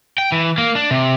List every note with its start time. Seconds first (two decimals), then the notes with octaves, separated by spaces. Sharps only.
0.18 G5
0.32 E3
0.58 A#3
0.75 D4
0.91 C3